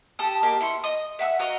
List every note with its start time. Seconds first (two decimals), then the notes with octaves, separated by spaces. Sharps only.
0.19 G4 A4 D#6
0.43 A#3 D#4 G4
0.61 E4 C6 C#6
0.84 D#5 D#6
1.19 E5 F#5 D#6 E6
1.39 F#4 A#4 D#5 F5